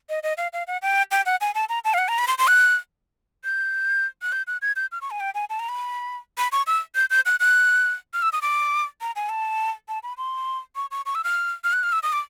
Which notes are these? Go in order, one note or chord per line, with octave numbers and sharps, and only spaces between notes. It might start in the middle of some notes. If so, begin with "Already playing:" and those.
D#5
D#5
F5
F5
F#5
G5
G5
F#5
G#5
A5
A#5
A5
F5
F#5
A#5
B5
C6
C6
F#6
G6
F#6
G6
F#6
G#6
G6
F6
C#6
G#5
G5
G#5
A5
A#5
B5
B5
C#6
E6
G6
G6
F#6
F#6
F6
E6
D#6
D6
A#5
G#5
A5
A5
B5
C6
C#6
C#6
C#6
E6
F6
F6
F#6
F6
E6
D#6
D6